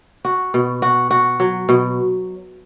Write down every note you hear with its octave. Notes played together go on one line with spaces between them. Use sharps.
F#4
B2
F#4
F#4
F#3
B2